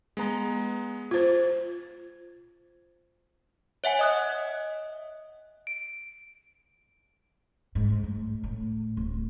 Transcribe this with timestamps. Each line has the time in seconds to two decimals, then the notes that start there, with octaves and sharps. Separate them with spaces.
0.17 G#3 B3 A#5
1.11 F4 C5 G#6 A6
3.84 C#5 E5 F#5 G#5
3.99 D#5 D#6 F#6
5.67 D7
7.75 G#2
8.04 A2
8.44 A2
8.97 D1